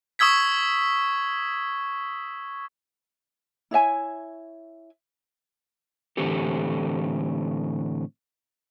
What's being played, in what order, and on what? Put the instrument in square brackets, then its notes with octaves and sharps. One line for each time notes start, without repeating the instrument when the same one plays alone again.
[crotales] C#6 D#6 E6 G#6 B6
[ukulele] E4 C#5 E5 G#5
[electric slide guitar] A2 D3 E3 C4 G4 A4